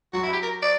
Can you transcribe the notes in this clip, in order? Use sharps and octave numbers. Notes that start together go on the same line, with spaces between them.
F#3 F#4
E4
G4
A#4
D5